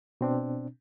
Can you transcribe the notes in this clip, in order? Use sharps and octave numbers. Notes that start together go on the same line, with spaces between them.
B2 C4 D4